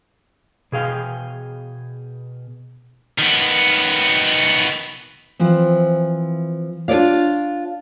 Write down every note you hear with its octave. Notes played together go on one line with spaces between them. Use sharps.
B2 G#4 F5 G5
D#3 B3
E3 F3 C4
D4 F4 A4 C#5 D5 F5